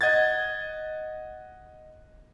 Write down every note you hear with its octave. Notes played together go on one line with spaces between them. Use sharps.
D#5 F#5 G#6 A6